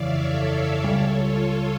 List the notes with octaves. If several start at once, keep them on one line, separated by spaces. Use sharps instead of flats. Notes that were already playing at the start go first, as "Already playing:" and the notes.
Already playing: G1 F2 C#3 E3 C#5 D5 E5 F5
A4 C#5
C#2 C#3 G3 A4 C#5
F4 A4
A4 C#5